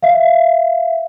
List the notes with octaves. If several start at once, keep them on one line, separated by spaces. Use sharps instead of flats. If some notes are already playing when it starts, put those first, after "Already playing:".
E5 F5